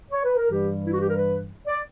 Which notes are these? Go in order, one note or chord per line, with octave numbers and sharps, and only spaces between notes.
C#5
B4
A#4
G2 E3 G3 G4
E4
F#4
G4
A#4
B4
D5